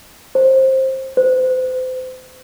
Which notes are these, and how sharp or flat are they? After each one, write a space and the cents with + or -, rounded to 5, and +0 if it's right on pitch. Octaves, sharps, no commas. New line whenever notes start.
C5 +15
C5 -35